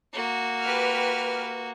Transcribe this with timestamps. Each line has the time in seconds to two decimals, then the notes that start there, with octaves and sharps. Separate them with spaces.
0.13 A#3 F#4
0.62 G4 B4 F6